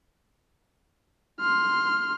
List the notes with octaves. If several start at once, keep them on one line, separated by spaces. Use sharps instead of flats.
C6 F6